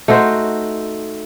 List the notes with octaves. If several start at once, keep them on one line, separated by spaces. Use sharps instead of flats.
A3 D#4 F#4 C5